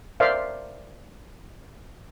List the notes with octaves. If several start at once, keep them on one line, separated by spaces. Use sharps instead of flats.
A#4 C5 D5 E5 F5